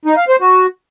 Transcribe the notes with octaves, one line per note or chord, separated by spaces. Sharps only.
D#4
F5
C5
F#4